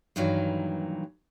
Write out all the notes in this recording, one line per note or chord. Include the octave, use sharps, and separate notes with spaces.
G2 A#2 D#3 E3 F#3